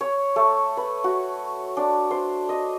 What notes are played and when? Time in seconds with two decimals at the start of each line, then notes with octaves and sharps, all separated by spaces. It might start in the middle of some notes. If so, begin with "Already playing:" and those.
0.01 C#5
0.36 A3
0.77 B4
1.04 F#4
1.77 D4
2.11 C5
2.49 D#5